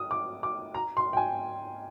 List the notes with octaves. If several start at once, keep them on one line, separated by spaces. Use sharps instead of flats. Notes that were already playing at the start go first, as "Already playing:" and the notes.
Already playing: D#6
D6
D6
A#5
C6
G5
G#5